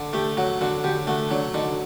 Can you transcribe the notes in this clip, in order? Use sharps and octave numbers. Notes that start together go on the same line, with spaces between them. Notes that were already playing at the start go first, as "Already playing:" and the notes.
Already playing: D3
A3 G4
F#3 F#4
D3 F#4
D3 G4
A3 F#4
F#3 D4
D3 D#4